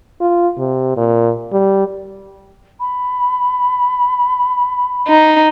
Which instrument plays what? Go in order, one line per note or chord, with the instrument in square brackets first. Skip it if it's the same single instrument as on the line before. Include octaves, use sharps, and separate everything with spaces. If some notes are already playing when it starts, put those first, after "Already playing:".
[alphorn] F4
C3
A#2
G3
[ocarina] B5
[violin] D#4